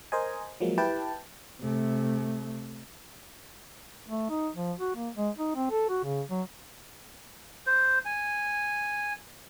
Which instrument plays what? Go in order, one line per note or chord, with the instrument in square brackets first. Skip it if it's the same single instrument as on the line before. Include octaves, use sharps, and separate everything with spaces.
[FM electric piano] A#4 C5 D#5 G#5
F3 F#3 G#3 A#3
E4 G4 B4 G5 A5
[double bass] C3 A3
[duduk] A3
D#4
F3
F#4
A#3
G#3
D#4
C4
A4
F#4
C#3
F#3
[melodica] C5
G#5